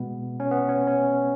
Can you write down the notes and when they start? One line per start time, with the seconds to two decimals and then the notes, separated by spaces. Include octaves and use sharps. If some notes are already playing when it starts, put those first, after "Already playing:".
Already playing: B2 G#3 B3
0.40 C#4
0.51 B3
0.69 C#4
0.87 C#4